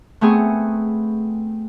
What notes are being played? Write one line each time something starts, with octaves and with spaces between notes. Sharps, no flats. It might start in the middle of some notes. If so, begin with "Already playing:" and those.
A3 B3 C4 G#4